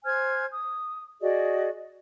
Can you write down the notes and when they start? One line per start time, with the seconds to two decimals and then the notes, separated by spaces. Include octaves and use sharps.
0.05 C5 G#5 F6 G#6
0.51 D#6
1.21 F#4 G#4 D5 D#5